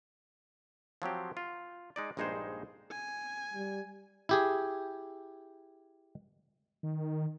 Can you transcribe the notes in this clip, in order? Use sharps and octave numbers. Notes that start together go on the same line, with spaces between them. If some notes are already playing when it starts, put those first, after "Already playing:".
F3 F#3 C4 G4
F4
G#3 D#4 D5
A#1 G2 G#3 D#4 G#4 C5
G#5
G3
E4 G4 G#4
D#3